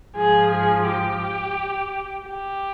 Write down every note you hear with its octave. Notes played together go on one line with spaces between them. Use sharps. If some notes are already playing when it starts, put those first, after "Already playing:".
G#2 F3 G#4
G#4
G4
G4